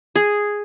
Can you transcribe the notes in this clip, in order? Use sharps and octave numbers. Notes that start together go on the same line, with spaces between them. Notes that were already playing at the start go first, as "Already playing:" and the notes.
G#4